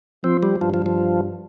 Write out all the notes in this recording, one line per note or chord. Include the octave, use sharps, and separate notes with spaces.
F3 C4
G3
G2 F3
F3
F3